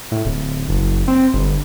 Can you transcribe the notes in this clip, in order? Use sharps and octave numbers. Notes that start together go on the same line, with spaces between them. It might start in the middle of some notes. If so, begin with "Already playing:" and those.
A2
D1
F#1
C4
G1